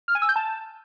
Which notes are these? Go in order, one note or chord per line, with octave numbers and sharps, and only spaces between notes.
F6
G#5
E6
G6
A5